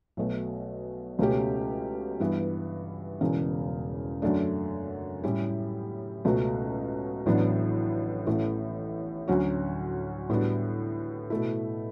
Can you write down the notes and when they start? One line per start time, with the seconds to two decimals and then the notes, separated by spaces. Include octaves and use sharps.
0.17 B1 B2 A3
1.19 C#2 B2 A3 C#4 G4
2.20 G2 E3 B3
3.21 E1 E2 C#3
4.22 F#2 D3 A3 D4
5.24 A2 G3 C#4 E4 G4
6.25 C#2 B2 A3 C#4 F#4
7.26 A1 A2 F#3 B3 D4
8.27 A1 A2 E3 A3
9.28 D2 D3 F#3 C#4 F#4
10.30 A2 G3 B3 D4 F#4
11.30 B2 A3 E4